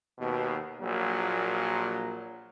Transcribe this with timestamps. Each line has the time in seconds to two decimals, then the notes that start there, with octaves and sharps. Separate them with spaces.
0.19 D#2 B2
0.82 A#1 A#2 F#3